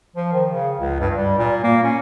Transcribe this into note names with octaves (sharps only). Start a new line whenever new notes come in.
F3
D#3
C#3
C#2
G2
G3
A#2
A#3
C#4